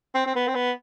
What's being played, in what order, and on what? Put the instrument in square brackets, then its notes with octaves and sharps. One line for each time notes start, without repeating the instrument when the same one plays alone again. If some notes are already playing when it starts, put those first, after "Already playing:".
[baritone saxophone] C4
C4
B3
C4
B3